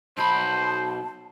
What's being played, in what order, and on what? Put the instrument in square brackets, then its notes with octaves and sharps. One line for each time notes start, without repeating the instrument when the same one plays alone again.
[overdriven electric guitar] B1 B5 [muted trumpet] C5 [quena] A5